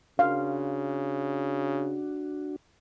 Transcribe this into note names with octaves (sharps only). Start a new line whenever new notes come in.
C#3 D4 F#4 F5